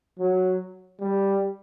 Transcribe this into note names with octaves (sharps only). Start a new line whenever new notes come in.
F#3
G3